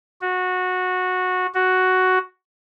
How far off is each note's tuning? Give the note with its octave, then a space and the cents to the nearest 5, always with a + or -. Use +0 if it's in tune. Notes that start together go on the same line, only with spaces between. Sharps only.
F#4 -15
F#4 +5